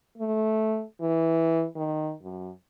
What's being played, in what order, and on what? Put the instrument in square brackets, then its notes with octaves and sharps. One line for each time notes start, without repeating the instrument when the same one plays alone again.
[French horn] A3
E3
D#3
F#2